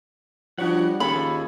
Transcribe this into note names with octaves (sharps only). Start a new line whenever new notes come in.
F3 G3 D4 F#4 C#5 F#5
D#2 A2 C#4 F4 G#4 A4 B5